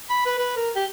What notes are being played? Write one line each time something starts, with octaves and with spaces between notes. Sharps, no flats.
B5
B4
B4
A#4
G4